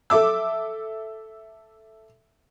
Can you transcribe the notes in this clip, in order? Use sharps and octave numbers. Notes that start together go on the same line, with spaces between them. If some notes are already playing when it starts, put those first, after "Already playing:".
A4 E5 D6 E6